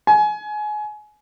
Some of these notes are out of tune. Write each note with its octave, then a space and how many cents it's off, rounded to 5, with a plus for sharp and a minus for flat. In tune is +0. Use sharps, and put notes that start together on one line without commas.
G#5 +25